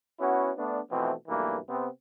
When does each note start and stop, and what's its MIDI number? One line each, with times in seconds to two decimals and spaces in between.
0.20 0.51 59
0.20 0.51 61
0.20 0.51 64
0.20 0.51 66
0.57 0.79 57
0.57 0.79 59
0.57 0.79 62
0.90 1.13 47
0.90 1.13 52
0.90 1.13 53
0.90 1.13 57
0.90 1.13 60
1.28 1.59 35
1.28 1.59 43
1.28 1.59 52
1.28 1.59 57
1.28 1.59 58
1.69 1.88 48
1.69 1.88 59
1.69 1.88 60